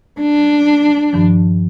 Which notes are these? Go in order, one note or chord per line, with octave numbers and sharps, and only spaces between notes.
D4
G2 D#3 F3